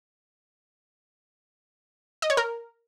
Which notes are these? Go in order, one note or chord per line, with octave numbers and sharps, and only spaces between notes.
D#5
C#5
A#4